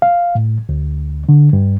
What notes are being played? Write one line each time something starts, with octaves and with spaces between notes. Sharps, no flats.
F5
A2
D2
D3
G2